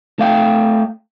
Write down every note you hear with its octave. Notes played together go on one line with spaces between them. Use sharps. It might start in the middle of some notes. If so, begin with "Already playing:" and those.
A3 F5 G5